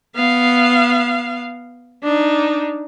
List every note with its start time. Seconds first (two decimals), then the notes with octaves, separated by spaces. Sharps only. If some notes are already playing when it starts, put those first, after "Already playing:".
0.16 B3 F5
2.03 D4 D#4